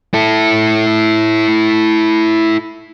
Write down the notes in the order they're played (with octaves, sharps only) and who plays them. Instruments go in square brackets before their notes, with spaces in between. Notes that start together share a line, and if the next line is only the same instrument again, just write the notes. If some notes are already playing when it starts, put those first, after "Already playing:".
[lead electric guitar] E4 A4